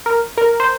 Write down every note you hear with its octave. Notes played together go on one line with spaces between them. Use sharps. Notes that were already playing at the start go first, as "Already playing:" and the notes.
A#4
A#4
C5